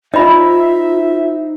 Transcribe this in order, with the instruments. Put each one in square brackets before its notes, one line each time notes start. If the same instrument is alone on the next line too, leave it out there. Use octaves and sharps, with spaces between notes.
[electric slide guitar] D#4 C5 A#5 [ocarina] F4 [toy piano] D#5 B5 [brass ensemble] E5